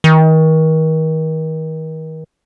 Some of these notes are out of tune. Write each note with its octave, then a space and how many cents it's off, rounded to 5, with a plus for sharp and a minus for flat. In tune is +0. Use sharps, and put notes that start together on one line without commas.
D#3 +35